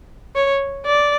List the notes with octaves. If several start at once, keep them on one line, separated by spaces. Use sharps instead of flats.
C#5
D5